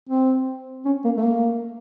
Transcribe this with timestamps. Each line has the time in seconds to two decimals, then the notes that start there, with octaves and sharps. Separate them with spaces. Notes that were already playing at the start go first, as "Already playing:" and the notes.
0.09 C4
0.85 C#4
1.04 A#3
1.17 A3
1.24 A#3